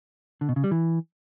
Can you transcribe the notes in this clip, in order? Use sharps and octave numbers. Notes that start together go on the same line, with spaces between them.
D3
B2
C#3
G3
E3